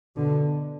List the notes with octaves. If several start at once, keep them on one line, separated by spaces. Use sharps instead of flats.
B2 D3